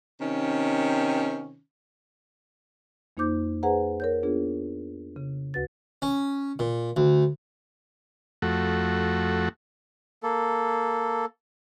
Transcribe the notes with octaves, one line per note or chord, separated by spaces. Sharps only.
C3 D#3 C#4
F2 A#3 D#4 C5 D6 G6
G#4 B4 C5 F#5 G#5 A#5
A#4 C#5 G6
B3 D4 F4 G#4
C#3
D2 F#4 B4 A6
C#4
A#2
D2
F2 A3 F#4
A#3 A4